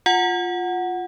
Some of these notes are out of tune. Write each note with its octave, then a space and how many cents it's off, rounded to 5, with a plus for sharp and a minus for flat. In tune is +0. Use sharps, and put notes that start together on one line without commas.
F4 +0 F#5 +0